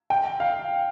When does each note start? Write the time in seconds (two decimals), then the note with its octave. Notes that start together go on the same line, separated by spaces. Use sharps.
0.10 G5
0.40 F5